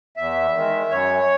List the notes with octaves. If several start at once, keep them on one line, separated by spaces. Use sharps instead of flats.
E2 E5
D#3 G#3
F#2 C#5